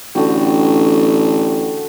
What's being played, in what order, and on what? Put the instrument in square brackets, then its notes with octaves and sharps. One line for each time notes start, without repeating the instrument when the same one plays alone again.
[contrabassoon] A1 [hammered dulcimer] D3 F#4 G5